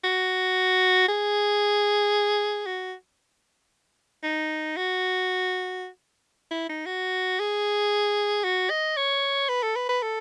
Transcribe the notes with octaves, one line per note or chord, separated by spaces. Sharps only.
F#4
G#4
F#4
D#4
F#4
E4
D#4
F#4
G#4
F#4
D#5
C#5
B4
A4
B4
B4
A4